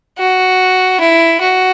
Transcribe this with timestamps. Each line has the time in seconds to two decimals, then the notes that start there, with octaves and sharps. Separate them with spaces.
0.18 F#4
1.00 E4
1.41 F#4